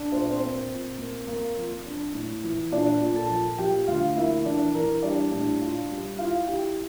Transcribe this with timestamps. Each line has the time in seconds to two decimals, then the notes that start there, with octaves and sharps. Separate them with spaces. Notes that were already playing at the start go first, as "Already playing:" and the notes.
Already playing: D4
0.12 A#2 C5
0.21 D5
0.30 C4 C5
0.41 A#3
0.70 A#2
0.98 A#3
1.27 A#3
1.57 F3
1.85 D4
2.14 A2
2.43 E3
2.72 A#2 D4 D5
3.00 A#2
3.15 A4 A5
3.30 F3
3.58 F3 G4 G5
3.87 D2 F4 F5
4.16 A#3 E4 E5
4.45 E3 D4 D5
4.75 E3 A#4
5.03 G3 D4 D5
5.31 A2 D4 D5
5.61 F4
5.90 G3
6.18 E4 F4 F5
6.47 E4 G4 G5